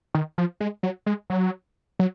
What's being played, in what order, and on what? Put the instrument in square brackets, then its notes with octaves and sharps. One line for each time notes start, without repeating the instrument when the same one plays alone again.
[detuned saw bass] D#3
F3
G#3
F#3
G#3
F#3
F#3